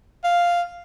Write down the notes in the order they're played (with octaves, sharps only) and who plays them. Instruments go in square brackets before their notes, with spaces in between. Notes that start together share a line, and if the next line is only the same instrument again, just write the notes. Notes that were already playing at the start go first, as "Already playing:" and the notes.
[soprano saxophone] F5